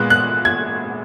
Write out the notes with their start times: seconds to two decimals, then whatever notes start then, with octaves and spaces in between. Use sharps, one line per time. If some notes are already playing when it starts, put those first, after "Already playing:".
Already playing: A#2 G#3 B3 F#6
0.10 F#6
0.45 G#6